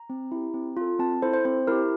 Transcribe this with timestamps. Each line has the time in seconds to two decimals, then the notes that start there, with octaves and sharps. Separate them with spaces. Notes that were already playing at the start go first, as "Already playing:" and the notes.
Already playing: A#5
0.10 C4
0.32 E4 G4
0.54 C4
0.77 F4 A4
0.99 C4 A5
1.22 E4 A4 C5
1.34 C5
1.45 C4 C5
1.67 E4 G4 A#4